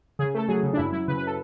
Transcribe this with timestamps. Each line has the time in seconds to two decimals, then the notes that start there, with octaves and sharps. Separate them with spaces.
0.19 C#3 G#4
0.34 A3 A4
0.48 F#3 G#4
0.63 C#3
0.73 D4
0.77 F#2 E4
0.92 F#3 E4
1.08 C#3 B4
1.18 B4
1.27 A4